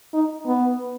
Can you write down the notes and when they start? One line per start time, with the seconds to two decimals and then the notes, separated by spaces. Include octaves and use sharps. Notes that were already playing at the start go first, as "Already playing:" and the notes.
0.14 D#4
0.47 B3